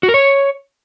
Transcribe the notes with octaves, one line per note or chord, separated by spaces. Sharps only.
F#4
A#4
C#5